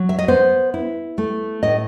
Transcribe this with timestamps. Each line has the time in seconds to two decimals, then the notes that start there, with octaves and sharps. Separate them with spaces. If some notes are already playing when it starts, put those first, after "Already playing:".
Already playing: F#3
0.09 E5
0.19 D#5
0.28 B3 C5
0.74 E4
1.18 A3
1.63 A2 D#5